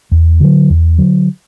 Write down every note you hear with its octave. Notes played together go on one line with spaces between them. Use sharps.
E2
D3 F#3
E2
D3 F#3